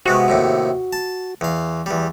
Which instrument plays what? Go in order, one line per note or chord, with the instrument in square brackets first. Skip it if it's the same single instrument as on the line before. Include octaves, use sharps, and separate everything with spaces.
[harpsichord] C3 G#3 B3 [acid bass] F#4
[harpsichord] D#2 A2 C3
A5
E2 F5
E2 G3